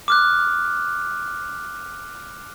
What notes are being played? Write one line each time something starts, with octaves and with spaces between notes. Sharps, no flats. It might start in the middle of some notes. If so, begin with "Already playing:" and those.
D6 F6 F#6